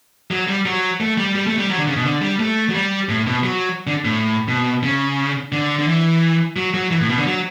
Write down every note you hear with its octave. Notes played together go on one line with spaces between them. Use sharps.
F#3
G3
F#3
A3
G3
G3
A3
G3
F#3
D3
C#3
B2
D3
G3
A3
F#3
G3
A2
B2
F#3
D3
A2
B2
C#3
D3
D3
E3
F#3
F#3
E3
A2
B2
D3
F#3